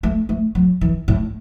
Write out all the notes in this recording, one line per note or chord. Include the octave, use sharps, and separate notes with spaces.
A3
A3
F#3
E3
A2